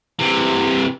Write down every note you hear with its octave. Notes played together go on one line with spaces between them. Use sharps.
C3 E3